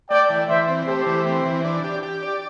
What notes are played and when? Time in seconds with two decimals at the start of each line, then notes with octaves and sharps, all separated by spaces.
0.09 A3 D5 G5
0.30 E3
0.48 E3 C5 E5
0.68 C4
0.87 A3 G4 C5
1.06 E3
1.26 C4
1.45 E3
1.64 D4
1.84 G4
2.03 G4
2.23 D5